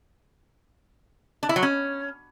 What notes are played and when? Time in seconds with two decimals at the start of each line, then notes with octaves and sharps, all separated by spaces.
1.43 D4
1.49 E4
1.56 F#3
1.63 C#4